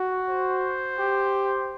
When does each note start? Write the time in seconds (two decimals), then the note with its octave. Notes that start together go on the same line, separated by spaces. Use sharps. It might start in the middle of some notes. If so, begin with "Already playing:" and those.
Already playing: F#4
0.30 C5
0.99 G4